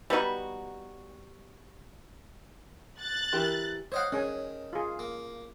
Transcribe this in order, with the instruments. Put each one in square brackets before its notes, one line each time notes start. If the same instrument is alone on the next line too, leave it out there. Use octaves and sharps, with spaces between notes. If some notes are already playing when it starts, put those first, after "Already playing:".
[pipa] G3 B3 D#4 F#4
[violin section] F#6 A6
[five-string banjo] E3 G4 A#4
[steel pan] C5 F#5 [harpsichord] C#5 D#5 F5
[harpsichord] D#3 [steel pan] C#4 G#4 G#5
[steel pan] F4 G#4
[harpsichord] A#3